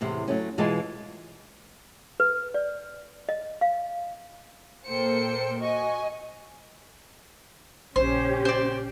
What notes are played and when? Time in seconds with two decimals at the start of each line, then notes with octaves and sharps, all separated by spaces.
0.01 E2 A2 C3
0.28 F#3 A3 C#4
0.58 B2 E3 G#3 F4 D#5 A5
2.20 B4
2.54 D5
3.29 D#5
3.61 F5
4.87 A#2 A#3 A4 C5 G5 C#7
5.59 F#4 D#5 G#5 C#6
7.96 A#1 C#3 C#4 G4 C5
8.45 C5 D5